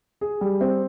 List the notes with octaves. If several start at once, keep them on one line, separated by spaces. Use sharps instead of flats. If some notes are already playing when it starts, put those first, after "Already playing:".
G#4
G3
C4